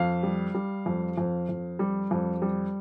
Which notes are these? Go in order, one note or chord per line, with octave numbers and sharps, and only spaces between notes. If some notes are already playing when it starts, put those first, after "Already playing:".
Already playing: F2 F5
G3
G3
F2
F2
F2
G3
F2
G3